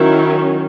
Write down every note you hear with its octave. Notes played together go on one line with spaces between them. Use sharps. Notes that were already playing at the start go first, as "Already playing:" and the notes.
Already playing: D#3 F#3 C#4 E4